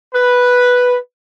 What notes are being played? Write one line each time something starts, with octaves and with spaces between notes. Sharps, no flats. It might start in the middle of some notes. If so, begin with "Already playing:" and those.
B4